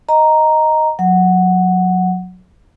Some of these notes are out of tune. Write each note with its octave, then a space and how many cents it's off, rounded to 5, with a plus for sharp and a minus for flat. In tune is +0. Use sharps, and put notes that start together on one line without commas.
D#5 +0 A#5 +0
F#3 -20 F#5 +0